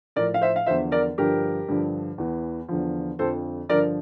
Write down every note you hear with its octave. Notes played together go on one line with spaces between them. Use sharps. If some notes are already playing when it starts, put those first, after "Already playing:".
A2 F3 A#4 D5
F5
C5 E5
F5
E2 D3 F3 C5 E5
A#4 D5
G2 D3 F3 G4 A#4
G2 D3 F3
E2 E3
E2 D3 F3
F2 D3 F3 A4 C5
G2 D3 F3 A#4 D5